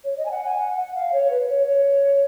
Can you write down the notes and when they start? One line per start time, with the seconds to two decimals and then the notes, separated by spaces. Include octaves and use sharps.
0.04 C#5
0.17 D#5
0.26 G#5
0.31 F#5
0.44 G#5
0.58 F#5
0.76 F#5
0.95 F5
1.12 C#5
1.30 B4
1.49 C#5
1.67 C#5